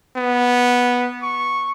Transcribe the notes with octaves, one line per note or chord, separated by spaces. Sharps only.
B3
C#6